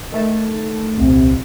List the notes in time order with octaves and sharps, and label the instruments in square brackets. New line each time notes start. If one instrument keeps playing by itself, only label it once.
[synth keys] D#3 A3 A5
[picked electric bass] D#1 C2 [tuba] C3